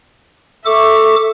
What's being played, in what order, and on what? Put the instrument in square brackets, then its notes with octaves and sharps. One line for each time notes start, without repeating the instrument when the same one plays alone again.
[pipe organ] A4 D6 [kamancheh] E5 C#6